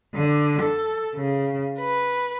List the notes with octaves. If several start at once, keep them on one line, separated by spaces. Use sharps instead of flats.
D3
A4
C#3
B4